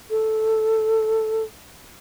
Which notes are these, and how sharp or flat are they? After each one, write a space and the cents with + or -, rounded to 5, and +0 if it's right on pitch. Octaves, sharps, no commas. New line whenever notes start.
A4 +0